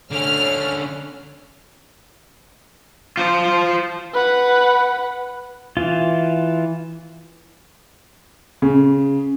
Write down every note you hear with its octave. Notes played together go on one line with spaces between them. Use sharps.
D2 D3 A3 C#4 C#5 F6
F4 C5
B4 F#5
E3 F4
C#3